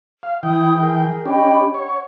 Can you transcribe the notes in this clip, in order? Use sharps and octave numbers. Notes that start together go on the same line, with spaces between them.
F5
E3 E4 G5 D#6
G#4 A#4
C#4 D4 G4 D#5 G5 B5
C#5 F#5